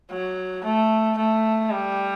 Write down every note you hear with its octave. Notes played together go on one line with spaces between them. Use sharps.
F#3
A3
A3
G3